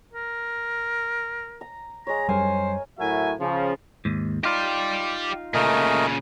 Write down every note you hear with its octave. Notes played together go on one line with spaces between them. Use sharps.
A#4
A#5
G#3 C#5 A#5
F#2 G3 A#4 C5 G#5
A2 F#3 F#4 A#4 E5 G#5
C#3 F3
D#2 G#2
D#4 F4 G4 D5
A#2 C#3 A3 A#4 D#5